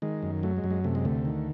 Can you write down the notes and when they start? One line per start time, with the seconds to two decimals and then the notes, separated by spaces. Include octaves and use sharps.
0.02 D#3 G#3
0.23 F#2
0.43 F#3 A3
0.57 G#3
0.64 F#2
0.71 G#3
0.84 C3 A3
0.95 G#3
1.05 D2 A3
1.25 D#3